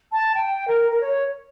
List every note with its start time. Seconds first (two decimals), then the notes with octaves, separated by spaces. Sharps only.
0.12 A5
0.34 G5
0.67 A#4
0.91 A#4
1.00 C#5